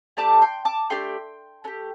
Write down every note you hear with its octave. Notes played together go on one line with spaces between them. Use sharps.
A3 D4 G4 A5 D6
G5 C6
A5 D6
A3 D4 G4 G5 C6
A3 D4 G4